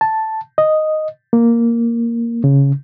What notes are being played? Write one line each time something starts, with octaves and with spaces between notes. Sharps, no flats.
A5
D#5
A#3
C#3